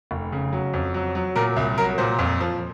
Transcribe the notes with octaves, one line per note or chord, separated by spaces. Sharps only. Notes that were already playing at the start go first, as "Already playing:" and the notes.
F1
C#3
F#3
F2
F#3
F#3
A#2 A#4
C2
F#3 A#4
A#2 C5
F2
F3